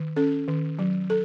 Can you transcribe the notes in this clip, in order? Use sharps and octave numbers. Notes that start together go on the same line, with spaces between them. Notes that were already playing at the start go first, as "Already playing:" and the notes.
Already playing: D#3
C#4 A4
D#3
F#3
A4